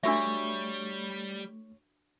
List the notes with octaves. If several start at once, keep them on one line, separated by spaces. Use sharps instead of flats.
G3 A3 D4 F#4 C#5 E5 C#6 E6